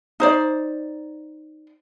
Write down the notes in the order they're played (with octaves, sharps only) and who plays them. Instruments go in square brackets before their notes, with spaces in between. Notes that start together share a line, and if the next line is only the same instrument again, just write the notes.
[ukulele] D#4 C5 D5